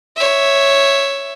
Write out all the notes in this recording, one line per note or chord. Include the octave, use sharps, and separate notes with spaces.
C#5 E5